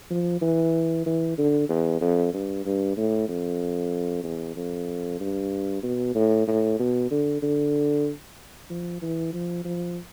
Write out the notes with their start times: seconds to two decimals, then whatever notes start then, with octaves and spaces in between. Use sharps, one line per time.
0.10 F3
0.41 E3
1.06 E3
1.38 D3
1.69 E2
2.01 F2
2.33 G2
2.65 G2
2.97 A2
3.28 F2
4.23 E2
4.56 F2
5.20 G2
5.83 B2
6.15 A2
6.47 A2
6.79 B2
7.11 D3
7.42 D3
8.70 F3
9.02 E3
9.33 F3
9.65 F3